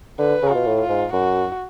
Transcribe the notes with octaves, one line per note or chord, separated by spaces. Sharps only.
D3 B4
C#3
B2 F4
A2
F4
G#2
F#2 F#4